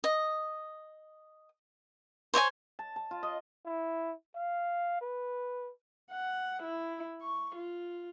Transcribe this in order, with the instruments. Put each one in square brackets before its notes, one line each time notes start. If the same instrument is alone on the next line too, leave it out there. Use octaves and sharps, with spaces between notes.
[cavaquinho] D#5
C5 C#5 D#5 G#5
[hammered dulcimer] A5
A5
F4
D#5
[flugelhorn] E4
F5
B4
[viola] F#5
E4
C#6
F4